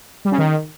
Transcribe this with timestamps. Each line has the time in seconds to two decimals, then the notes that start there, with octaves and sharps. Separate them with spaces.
0.25 G3
0.32 C#3
0.38 D#3